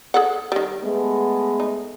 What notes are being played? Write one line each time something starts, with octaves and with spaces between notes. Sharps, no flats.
G#4 A4 F#5
D#3 G3
G#3 A3 B3
D#4